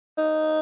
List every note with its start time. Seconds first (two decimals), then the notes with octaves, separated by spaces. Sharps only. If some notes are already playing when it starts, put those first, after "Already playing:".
0.18 D#4